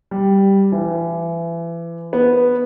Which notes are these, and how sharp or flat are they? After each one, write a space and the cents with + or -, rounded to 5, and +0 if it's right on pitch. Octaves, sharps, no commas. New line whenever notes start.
G3 +0
E3 +30
B3 -5